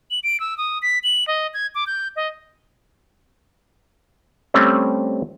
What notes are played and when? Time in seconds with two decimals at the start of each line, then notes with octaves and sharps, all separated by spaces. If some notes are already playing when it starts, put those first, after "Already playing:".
0.11 F#7
0.24 D7
0.40 E6
0.58 D#6
0.82 B6
1.04 F#7
1.28 D#5
1.54 G#6
1.75 D6
1.87 G6
2.16 D#5
4.54 G3 A3 C4 C#4